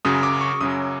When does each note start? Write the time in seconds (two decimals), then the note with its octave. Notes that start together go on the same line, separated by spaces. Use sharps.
0.05 F#2 C#3 F#3 D#6
0.23 D6
0.41 C#6
0.61 F#2 C#3 F#3 D#6